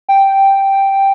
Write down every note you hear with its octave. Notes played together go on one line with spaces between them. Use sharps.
G5